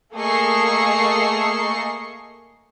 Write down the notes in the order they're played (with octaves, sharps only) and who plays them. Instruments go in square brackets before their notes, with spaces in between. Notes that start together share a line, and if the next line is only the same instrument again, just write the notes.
[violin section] A3 A#3 G#4 D#5 C#6 C7